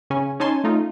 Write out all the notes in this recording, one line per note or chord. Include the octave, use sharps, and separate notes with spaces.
C#3 C#4 G#5
C#4 D#4 C#5 G#5 A5 C6
A3 D#4 F4